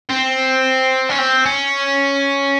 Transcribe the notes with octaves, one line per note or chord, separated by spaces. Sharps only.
C4
C#4
C4
C#4